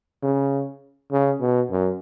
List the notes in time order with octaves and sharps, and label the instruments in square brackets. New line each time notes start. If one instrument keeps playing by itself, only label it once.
[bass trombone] C#3
C#3
B2
F#2